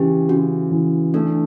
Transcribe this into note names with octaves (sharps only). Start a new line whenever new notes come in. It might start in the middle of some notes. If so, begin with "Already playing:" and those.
Already playing: C#3 E3 G4
C#3 F#4
E3
A3 D4